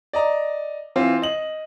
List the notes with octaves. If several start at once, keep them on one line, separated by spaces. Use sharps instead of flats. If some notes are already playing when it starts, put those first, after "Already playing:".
D5 D#5 A#5
E3 C4 F4
D#5 F#7